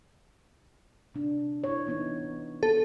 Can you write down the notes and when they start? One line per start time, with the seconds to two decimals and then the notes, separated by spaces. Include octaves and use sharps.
1.15 C3 D4
1.64 E4 C#5
1.86 E3 B3 D#4
2.63 B3 A4